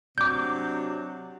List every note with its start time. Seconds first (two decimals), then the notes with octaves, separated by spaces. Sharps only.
0.18 C3 F#3 D4 D6 G6